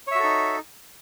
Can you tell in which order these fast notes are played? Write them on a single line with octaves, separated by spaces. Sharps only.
C#5 E5 F#4 A4 D#4